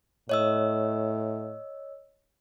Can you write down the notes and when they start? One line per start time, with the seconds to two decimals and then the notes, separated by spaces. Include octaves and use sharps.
0.29 A2 C#5 D#5 E6